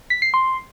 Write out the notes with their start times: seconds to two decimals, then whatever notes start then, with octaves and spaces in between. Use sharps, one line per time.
0.10 B6
0.22 C7
0.34 C6